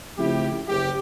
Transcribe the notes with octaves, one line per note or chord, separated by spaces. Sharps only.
C#3 F3 A3 C4 E4 G4
F#1 G4